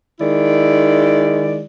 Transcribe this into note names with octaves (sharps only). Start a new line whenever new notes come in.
D#3 G#3 E4 D5